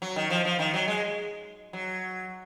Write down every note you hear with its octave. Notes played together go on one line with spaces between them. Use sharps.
F#3
D#3
F3
F3
D#3
F#3
G#3
F#3